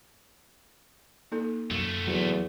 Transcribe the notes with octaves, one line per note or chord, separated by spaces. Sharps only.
A#3 D#4 A4
F#2 A3 F4
E2 F#3